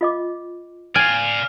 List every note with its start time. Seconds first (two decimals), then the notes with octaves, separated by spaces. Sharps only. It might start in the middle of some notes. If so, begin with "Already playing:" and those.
0.01 F4 D#5 D6
0.95 D5 F5 G#5 F6